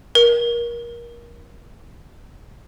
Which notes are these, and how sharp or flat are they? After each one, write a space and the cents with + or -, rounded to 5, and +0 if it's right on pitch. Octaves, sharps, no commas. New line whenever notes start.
A#4 +25